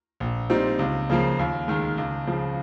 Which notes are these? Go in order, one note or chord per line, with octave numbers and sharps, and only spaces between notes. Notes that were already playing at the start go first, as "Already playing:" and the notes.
A#1
A#2 G3 C4 D#4
C#2
C#3 F3 A#3
D#2
D#3 G#3
C#2
C#3 F3